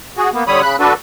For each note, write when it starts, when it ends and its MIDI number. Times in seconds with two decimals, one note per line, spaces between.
0.17 0.30 66
0.17 0.30 68
0.34 0.44 58
0.34 0.44 59
0.47 0.62 50
0.47 0.62 55
0.47 0.62 73
0.47 0.62 83
0.47 0.62 87
0.62 0.76 49
0.62 0.76 83
0.62 0.76 90
0.80 0.93 62
0.80 0.93 66
0.80 0.93 69
0.80 0.93 71